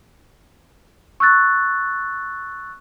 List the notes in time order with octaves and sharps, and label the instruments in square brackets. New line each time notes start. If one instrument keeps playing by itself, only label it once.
[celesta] C#6 E6 F#6 A6